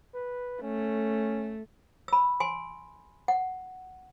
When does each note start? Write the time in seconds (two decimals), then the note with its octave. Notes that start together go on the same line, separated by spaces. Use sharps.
0.14 B4
0.62 A3 C#4
2.08 B5 E6
2.40 G#5 C6
3.28 F#5